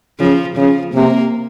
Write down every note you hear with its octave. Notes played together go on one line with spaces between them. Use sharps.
C#3 F3
C#3 F3
C3 A#3